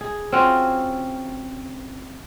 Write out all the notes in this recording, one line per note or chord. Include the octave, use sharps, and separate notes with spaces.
G#4
C4 C#4 F4 F#4